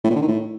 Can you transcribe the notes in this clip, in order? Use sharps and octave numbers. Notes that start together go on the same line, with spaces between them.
A2
A#2
D3
D#3
A2